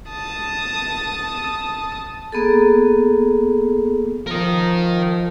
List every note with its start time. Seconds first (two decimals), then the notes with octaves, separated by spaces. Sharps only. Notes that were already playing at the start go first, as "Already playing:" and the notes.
0.10 A5 D#6
2.32 A#3 B3 G#4 A4
4.27 F3 A#4 D#5